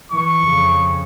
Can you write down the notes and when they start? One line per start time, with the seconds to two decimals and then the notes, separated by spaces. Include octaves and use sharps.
0.12 E3 C#6
0.44 F2 C#3